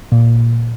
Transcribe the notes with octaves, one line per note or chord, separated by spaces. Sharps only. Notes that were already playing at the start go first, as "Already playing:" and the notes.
A#2